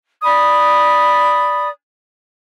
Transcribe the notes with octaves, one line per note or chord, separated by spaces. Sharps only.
D5 B5 D#6